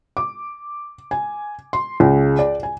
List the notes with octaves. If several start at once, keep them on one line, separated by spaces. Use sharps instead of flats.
D6
G#5
C6
C#2
D5
G#5